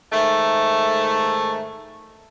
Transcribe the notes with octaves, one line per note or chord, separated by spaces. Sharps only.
G#2 D#3 A3